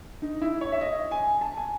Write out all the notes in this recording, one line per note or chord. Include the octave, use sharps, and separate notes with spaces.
D#4
E4
C#5
E5
D#5
G#5
A5
G#5